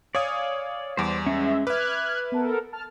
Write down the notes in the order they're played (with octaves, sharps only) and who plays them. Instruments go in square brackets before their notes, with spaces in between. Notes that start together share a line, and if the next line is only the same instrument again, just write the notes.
[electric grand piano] C#5 F5 D#6 [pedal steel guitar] D5 G#5
[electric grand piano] E2 G3 [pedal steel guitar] C5 D5 D6
[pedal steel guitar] G#3 C#4 [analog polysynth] E5
[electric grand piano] B4 E5 [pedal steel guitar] D6 [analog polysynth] F6 F#6 G#6
[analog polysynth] B3 A4 A#4
A5 F6